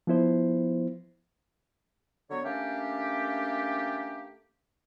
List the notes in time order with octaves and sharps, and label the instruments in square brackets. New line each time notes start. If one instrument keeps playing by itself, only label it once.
[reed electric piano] F3 B3 E4 C5
[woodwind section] D3 F#3 B3 C#5
A3 A#3 C#4 D4 G4